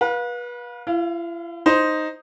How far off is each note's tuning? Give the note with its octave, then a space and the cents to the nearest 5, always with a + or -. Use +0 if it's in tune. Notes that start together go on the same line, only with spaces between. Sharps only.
B4 -30 F5 +30
E4 +45 F5 +0
D#4 +0 C5 +0